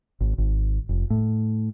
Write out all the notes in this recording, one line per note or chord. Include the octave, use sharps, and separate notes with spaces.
G#1
G#1
F1
A2